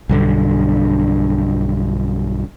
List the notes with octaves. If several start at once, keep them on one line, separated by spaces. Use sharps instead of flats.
B1 G2 D3